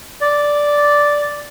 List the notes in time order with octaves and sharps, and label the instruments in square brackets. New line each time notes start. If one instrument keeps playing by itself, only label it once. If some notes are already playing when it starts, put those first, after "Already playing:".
[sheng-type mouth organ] D5